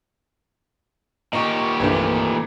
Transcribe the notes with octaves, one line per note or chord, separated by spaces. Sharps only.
A#2 D#3 G4 D#5 C#6
C2 G2 E3 A3